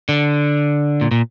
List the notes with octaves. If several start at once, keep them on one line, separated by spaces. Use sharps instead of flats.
D3
A#2
A#2